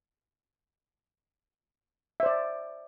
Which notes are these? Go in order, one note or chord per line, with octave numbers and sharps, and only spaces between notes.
C5 D5 E5